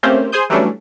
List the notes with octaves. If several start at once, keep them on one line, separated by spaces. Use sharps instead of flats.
A3 A#3 C4 C#4 G4 C5
G#4 C5 G#5 C6 D#6 G6
E3 F#3 G3 A3 C#4 D4